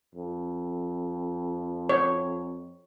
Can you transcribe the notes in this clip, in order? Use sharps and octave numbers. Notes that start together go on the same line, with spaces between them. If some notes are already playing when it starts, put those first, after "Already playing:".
F2
C#5